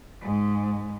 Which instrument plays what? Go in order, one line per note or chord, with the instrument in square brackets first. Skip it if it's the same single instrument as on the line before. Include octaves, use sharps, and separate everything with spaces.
[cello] G#2 G#3